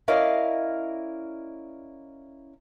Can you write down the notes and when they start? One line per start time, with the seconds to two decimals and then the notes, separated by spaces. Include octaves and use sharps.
0.08 C#4 E4 A#4 D5 D#5 F5